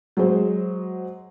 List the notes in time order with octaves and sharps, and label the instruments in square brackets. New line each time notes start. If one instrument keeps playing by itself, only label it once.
[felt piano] F#3 G#3 G#4 C5